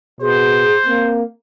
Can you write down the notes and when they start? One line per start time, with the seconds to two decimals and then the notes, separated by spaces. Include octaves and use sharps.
0.21 B2 G#4 C5
0.86 A#3 C4